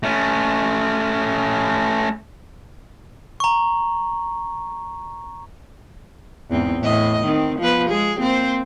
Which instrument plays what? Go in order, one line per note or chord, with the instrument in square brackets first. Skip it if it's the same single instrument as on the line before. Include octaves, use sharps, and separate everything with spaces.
[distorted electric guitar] A3 C#4
[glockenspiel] A#5 C#6
[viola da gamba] E2 G#2 C4
A2 E3 D#5
D#3 C4
F3 B3 B4
G#3 G#4
A#3 C4 C5